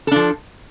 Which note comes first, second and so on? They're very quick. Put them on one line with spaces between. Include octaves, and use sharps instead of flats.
A4 D4 F3